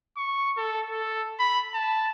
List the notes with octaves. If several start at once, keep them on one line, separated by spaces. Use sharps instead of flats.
C#6
A4
A4
B5
A5